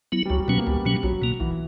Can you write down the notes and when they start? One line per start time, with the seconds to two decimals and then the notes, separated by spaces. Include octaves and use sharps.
0.12 F#3 B3 E4
0.25 G3
0.30 C#2 F#3
0.40 G3
0.48 B2 F#3 B3 C#4
0.58 A#3
0.67 C#2 G3
0.85 B2 F#3 C#4
1.03 B1 F#3
1.22 B2 A#3
1.40 B1 E3